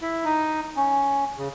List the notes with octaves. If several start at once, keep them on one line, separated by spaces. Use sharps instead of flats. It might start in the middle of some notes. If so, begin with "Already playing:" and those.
E4
D#4
C#4
C#3